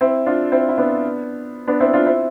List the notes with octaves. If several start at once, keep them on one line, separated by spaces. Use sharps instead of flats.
C4 E4
D4 F4
C4 E4
E4
B3 D4
B3 D4
C4 E4
D4 F4
C4 E4